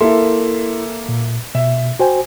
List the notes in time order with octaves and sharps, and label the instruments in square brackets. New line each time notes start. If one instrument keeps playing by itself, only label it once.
[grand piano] A#3 A4 E5 [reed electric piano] E4 C6
[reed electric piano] A#2
[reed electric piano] B2 [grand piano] E5
[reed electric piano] F#4 C5 G#5 [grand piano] G5